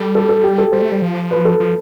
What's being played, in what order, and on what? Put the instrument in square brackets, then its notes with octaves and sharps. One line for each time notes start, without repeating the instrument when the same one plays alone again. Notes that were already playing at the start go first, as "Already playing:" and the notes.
Already playing: [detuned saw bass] G3 [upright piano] A4
[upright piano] A4
A4
G4
A4
[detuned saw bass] G3 [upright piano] C5
[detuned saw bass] A3
G3
F3
[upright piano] B4
A4
[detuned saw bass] F3